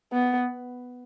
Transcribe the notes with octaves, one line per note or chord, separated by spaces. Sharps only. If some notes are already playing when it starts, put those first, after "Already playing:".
B3